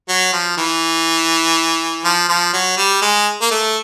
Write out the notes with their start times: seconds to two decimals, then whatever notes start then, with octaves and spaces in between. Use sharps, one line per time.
0.09 F#3
0.33 F3
0.57 E3
2.05 F3
2.29 F3
2.53 F#3
2.77 G3
3.01 G#3
3.41 A#3
3.51 A3